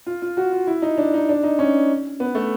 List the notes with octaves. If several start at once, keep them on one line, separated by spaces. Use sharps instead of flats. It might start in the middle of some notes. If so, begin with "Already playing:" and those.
F4
F4
F#4
F4
E4
D#4
D4
D#4
D4
D#4
C#4
B3
A3